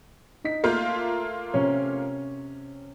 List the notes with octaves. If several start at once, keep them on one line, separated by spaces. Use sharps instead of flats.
D#4 B6
A3 A#3 F4 C6 G6
C3 C#4 C#5